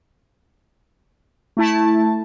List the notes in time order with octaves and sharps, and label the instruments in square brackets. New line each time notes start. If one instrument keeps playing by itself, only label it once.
[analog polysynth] A3 E4 A5